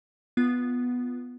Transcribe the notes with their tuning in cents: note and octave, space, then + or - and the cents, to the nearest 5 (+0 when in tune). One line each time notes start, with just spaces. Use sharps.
B3 +0 F4 +0